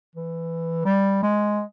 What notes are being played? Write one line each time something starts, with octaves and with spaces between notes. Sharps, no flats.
E3
G3
G#3